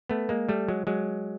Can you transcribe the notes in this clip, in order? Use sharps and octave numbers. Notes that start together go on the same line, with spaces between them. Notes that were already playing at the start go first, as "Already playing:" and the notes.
A3 B3
G#3 A#3
G3 A3
F#3 G#3
F#3 G#3